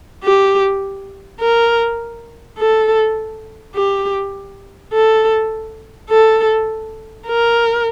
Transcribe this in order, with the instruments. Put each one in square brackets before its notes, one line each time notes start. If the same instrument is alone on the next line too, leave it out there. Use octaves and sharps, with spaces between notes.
[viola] G4
A#4
A4
G4
A4
A4
A#4